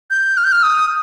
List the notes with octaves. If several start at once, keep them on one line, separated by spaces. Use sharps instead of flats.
G6
F6
G6
F6
D#6